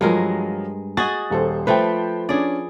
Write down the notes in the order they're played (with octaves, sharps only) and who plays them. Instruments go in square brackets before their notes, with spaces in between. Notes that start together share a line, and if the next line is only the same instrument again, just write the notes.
[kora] G2 G#3 A#4 [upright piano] F3 F#3
[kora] F#4 G#4 D#5 [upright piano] A6
[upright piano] D#1 A4 C5
[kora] F3 A3 B4 [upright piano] C5 G5
[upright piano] C#4 D4 [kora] G#4 D5